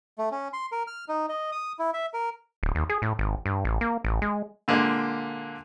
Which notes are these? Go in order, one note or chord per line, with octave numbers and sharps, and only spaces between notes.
A3
C#4
C6
A#4
F6
D#4
D#5
D#6
E4
E5
A#4
D1
D#2
G#4
A2
G#1
G2
A1
A#3
A1
G#3
A#2 D3 G#3 A#3